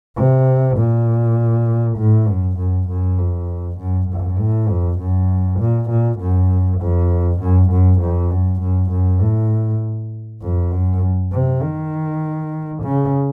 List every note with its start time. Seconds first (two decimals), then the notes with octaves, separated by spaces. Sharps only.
0.17 C3
0.78 A#2
1.98 A2
2.28 F#2
2.58 F#2
2.89 F#2
3.19 F2
3.79 F#2
4.09 F#2
4.39 A2
4.69 F2
5.00 F#2
5.60 A#2
5.90 A#2
6.20 F#2
6.81 F2
7.41 F#2
7.71 F#2
8.01 F2
8.31 F#2
8.61 F#2
8.91 F#2
9.21 A2
10.42 F2
10.72 F#2
11.32 C3
11.63 D#3
12.83 C#3